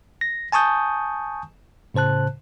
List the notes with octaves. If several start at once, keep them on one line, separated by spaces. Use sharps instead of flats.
A#6
G#5 A5 C#6 D#6 G6
A2 C#3 C5 A5 F#6